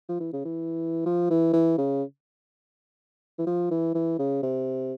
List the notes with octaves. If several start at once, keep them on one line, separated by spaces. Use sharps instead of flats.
F3
E3
C#3
E3
F3
E3
E3
C#3
E3
F3
E3
E3
C#3
C3